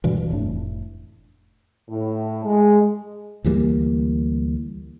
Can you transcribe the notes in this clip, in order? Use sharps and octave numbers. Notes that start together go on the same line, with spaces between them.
D2 G2 B2 E3
F1 A2 D4
A2
G#3
D2 E3 G3 A#3